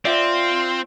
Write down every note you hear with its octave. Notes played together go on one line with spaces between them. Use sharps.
C4 F4 D5 E5